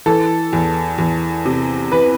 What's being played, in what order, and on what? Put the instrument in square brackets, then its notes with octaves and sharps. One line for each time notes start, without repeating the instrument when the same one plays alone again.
[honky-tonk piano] E3 A4
E2
E2
C3
E3 B4